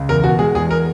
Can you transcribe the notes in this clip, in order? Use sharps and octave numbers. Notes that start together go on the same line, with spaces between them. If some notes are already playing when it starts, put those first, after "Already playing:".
Already playing: C#2
E2 A#4
B2 F#4
G#3 G#4
E2 G#4
A#4